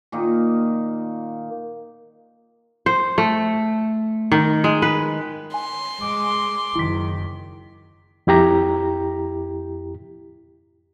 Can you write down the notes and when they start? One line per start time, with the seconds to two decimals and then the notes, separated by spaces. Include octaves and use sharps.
0.12 A#2 D#3 A#3 D#4
2.86 C5
3.18 A3
4.32 D#3
4.64 G#3
4.82 B4
5.54 G#5 C6
6.01 G#3 D6
6.75 F#1 D#3 E4 B6
8.27 F2 E4 G4 A#5